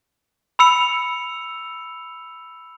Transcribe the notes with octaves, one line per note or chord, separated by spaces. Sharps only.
B5 E6 C#7 F7